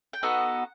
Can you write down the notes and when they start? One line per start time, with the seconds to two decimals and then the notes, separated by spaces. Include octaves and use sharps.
0.13 G5
0.23 B3 D#4 F#4 A4 F#5